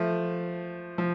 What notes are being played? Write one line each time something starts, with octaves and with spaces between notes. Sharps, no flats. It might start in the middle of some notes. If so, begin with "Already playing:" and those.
Already playing: F3 A3
F3